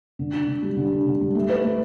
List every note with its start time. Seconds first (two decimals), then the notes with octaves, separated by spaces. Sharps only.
0.19 D3
0.33 D4
0.48 D3
0.63 G3
0.77 D3
0.92 D4
1.06 D3
1.21 G3
1.35 A3
1.49 B4
1.64 A3